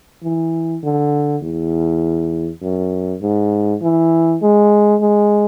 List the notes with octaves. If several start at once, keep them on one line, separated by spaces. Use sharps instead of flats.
E3
D3
E2
F#2
G#2
E3
G#3
G#3